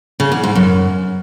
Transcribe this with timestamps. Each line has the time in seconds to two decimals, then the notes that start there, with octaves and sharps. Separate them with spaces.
0.20 C#3
0.32 E2
0.44 G#2
0.55 F#2